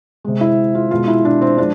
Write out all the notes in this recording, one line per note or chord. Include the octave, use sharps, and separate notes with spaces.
C3 G#3
E4
F4
B2 G#3 F4
E4
D4
C4
F3 G#3 D4